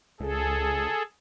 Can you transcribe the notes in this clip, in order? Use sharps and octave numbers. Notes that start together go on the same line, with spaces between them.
C#2 G#4 A4